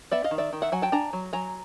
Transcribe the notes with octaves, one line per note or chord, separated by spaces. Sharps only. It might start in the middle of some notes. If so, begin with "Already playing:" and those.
B3 D5 E5
D#5 F5
D#3
D5 E5
D#3
E5 F#5
F#3 F#5 G#5
G5 A5
D4 G#5 A#5
F#3
F#3 G#5 A#5